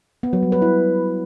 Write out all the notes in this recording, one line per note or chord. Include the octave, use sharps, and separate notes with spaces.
B3
F#3
G3
B4
E4